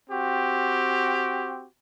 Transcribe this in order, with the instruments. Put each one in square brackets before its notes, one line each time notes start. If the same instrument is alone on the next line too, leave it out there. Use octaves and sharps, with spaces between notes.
[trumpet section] C4 F#4 G4